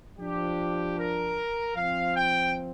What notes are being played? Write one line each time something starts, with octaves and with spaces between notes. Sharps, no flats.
F3 D4 G4
A#4
F3 C4 F5
G5